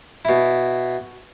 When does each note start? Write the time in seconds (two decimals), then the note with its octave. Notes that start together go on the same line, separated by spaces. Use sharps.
0.25 B2 E4